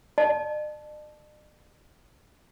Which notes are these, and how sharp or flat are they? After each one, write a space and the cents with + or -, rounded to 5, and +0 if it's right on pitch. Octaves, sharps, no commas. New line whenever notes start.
D5 +45 A5 -10